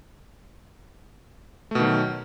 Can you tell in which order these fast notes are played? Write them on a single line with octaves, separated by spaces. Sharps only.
A3 B2 D#3 F#3